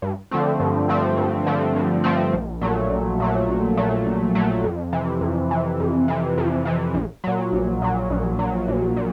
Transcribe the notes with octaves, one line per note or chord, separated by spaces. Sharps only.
G2
D3 F3 A3 C4
G2
D3 F3 A3 C4
G2
D3 F3 A3 C4
G2
D3 F3 A3 C4
A#1
A#2 F#3 A3
A#1
A#2 F#3 A3
A#1
A#2 F#3 A3
A#1
A#2 F#3 A3
F2
C3 E3
F2
C3 E3
F2
C3 E3
F2
C3 E3
A#1
A#2 F#3
A#1
A#2 F#3
A#1
A#2 F#3
A#1
A#2